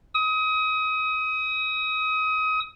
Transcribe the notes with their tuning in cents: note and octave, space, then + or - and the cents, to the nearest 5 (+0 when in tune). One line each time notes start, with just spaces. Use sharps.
D#6 +30